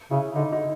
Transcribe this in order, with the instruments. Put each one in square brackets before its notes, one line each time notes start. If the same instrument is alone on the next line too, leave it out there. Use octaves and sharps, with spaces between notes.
[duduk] C#3 [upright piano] E4
[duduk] D3 [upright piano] D#4
[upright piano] D#4